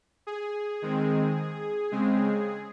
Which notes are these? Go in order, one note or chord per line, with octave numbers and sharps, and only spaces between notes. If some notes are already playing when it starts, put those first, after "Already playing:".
G#4
D#3 G#3 C4
C#3 G#3 C4